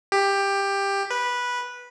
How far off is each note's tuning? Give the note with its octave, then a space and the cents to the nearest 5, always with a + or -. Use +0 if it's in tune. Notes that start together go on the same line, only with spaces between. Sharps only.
G4 +15
B4 -10